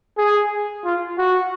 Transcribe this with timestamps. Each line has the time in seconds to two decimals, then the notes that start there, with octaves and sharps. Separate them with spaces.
0.17 G#4
0.85 F4
1.18 F#4